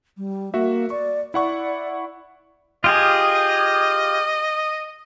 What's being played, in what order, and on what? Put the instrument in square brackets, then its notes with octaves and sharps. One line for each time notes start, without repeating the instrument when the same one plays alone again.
[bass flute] G3
[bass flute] A#3 [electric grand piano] F#4 E5
[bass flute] D5 [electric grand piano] C#6
[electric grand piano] E4 F#5 C#6 [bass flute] D5
[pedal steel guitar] F4 G4 G#4 [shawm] D#5